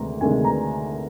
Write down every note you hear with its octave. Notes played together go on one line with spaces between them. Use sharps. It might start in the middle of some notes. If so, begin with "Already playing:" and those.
Already playing: D2 C3 D#3 G#3 A#5
D2 C3 D#3 G#3 G#5
A#5